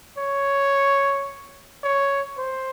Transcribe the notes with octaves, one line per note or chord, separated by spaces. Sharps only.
C#5
C#5
C5